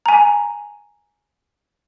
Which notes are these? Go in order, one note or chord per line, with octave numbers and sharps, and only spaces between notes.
G#5 A#5